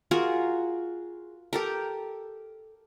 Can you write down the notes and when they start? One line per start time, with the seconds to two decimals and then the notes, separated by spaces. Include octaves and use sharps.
0.11 F4 F#4 G#4 A#4
1.53 G4 A4 A#4